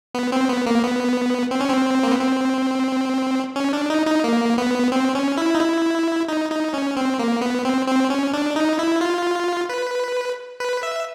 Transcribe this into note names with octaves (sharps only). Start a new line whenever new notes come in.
B3
C4
B3
A#3
B3
C4
C#4
C4
A#3
B3
C4
C#4
D4
D#4
D#4
A#3
B3
C4
C#4
E4
D#4
E4
D#4
D#4
C#4
C4
A#3
B3
C4
C4
C#4
D4
D#4
E4
F4
B4
B4
E5